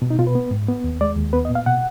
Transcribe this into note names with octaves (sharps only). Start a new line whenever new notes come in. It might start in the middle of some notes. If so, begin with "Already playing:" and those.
B2
D#4
B2 F4
B4
B3
G#2
B3
D#2
G#3 D5
D#2
B3 B4
D#5
A#2
F5
B2 F#5